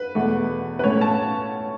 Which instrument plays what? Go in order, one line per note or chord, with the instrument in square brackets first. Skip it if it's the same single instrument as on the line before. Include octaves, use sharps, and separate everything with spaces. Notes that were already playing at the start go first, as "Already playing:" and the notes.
Already playing: [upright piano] B4
E2 B2 A3
B4
A2 A3 C#4 C#5
A5